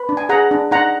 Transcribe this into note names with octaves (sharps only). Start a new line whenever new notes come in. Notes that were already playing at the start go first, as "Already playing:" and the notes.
Already playing: B4 B5
D4
G#5
G#4 F#5 A#5
D4
D#4 F#5 A#5